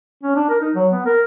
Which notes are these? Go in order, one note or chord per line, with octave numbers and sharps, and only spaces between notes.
C#4
D4
A#4
D#4
F#3
B3
A#4